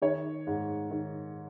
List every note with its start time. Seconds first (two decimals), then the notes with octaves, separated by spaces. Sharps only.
0.02 D#3 C#5
0.47 G#2
0.91 D#3